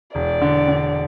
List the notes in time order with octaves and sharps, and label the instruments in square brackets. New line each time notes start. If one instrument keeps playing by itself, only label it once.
[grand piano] E1 [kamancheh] D5
[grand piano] D3
D3